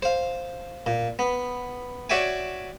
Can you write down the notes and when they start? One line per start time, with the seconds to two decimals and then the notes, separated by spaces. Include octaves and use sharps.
0.02 C5 F5
0.86 A#2
1.19 B3
2.10 F#4 C#5 D5 E5 G5 G#5